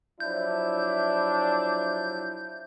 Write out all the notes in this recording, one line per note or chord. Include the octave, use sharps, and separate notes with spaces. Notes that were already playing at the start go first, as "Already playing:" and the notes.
F3 F#3 D4 E4 G6